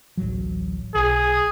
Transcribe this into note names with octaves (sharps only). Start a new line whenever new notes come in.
D1 A1 F#3
B1 G#4